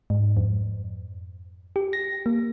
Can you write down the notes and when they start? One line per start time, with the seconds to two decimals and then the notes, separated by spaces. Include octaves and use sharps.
0.10 G#2
0.37 F2
1.76 G4
1.93 A#6
2.26 A#3